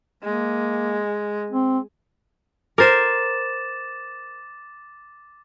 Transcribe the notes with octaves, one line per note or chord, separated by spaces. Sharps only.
G#3 A#3
C4
A#4 C5 D6 A6 E7